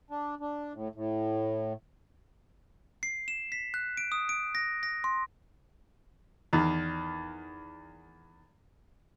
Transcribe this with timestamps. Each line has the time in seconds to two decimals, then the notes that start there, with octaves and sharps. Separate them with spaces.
0.10 D4
0.40 D4
0.74 A2
0.95 A2
3.03 C7
3.28 E7
3.52 B6
3.74 F#6
3.97 D7
4.12 D#6
4.29 D7
4.55 A#6
4.83 A#6
5.04 C6
6.53 E2 D#3